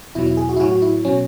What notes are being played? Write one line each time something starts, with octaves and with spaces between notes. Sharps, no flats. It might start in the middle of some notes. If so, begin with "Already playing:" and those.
E2 B2 F#3 E4
E4
G#4
F#4
E4
A2 F#3 F#4
F#4
E4
B2 F#3 C#4